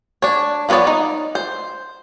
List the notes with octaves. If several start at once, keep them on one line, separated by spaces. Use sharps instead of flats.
D4 C#5
F3 B3 F#4 C#5 D5
D#4
C5